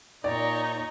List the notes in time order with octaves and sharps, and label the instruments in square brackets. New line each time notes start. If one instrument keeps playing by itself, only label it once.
[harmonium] A#2 [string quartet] D#4 C#5 A#5 [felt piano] D5